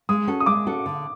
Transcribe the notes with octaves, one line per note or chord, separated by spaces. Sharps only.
G#3 D#6
C#4 F#4 A4
D#6
G#3 D6
C#4 F#4 A4
D3